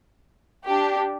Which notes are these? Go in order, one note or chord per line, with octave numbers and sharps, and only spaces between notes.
D4 G4